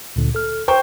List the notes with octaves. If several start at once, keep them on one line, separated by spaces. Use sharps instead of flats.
D2 A#2 D3
A4 F6
C5 G5 C#6 G6